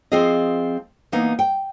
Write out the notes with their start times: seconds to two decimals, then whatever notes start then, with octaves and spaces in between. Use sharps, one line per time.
0.12 F3 C4 F4 G#4 D#5
1.12 E3 A#3 B3 D#4
1.39 G5